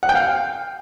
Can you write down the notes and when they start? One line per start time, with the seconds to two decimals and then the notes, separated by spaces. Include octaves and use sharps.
0.03 F#5
0.09 G5
0.15 F5